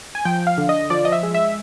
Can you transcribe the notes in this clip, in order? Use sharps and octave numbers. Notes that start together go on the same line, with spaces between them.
G#5
F3 G5
F5
D3
D#5
F3 D5
D#5
E5
G#3
E5